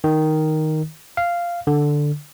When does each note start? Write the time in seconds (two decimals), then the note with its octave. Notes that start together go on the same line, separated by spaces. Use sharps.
0.04 D#3
1.17 F5
1.67 D3